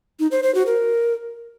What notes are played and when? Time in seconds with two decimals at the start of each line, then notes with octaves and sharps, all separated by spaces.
0.20 D#4
0.31 C5
0.43 C5
0.55 F#4
0.66 A#4